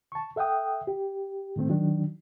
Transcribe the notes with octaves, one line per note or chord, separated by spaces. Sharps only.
A5 C#6
A4 E5 F#5 G5 D#6
G4
A2 D#3 A3 C4
D#3 F#3 D4